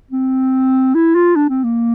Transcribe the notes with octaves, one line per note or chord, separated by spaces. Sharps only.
C4
E4
F4
D4
C4
A#3